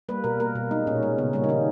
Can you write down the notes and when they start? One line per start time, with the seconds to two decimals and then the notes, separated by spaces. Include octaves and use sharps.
0.09 G3 A#3 B4
0.24 B2 A#4
0.40 A#3 A#4
0.55 B2
0.71 G#3 D#4
0.87 A#2 C#4
1.03 G#3
1.18 C#3 B3
1.33 G3 A#3 C#4
1.44 D#4
1.49 D#3 C#4